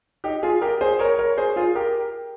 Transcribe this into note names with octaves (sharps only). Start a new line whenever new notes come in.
D#4 G4
F4 G#4
G4 A#4
G#4 C5
A#4 C#5
A#4 C#5
G#4 C5
F4 G#4
G4 A#4